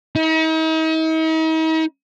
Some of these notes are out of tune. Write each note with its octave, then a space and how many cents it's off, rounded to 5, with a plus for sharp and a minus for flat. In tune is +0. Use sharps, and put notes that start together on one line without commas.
D#4 +45